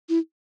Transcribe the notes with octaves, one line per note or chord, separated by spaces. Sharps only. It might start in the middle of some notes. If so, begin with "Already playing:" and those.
E4